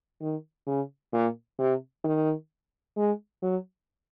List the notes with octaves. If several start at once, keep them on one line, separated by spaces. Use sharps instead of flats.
D#3
C#3
A#2
C3
D#3
G#3
F#3